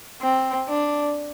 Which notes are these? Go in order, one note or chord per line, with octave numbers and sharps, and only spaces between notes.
C4
D4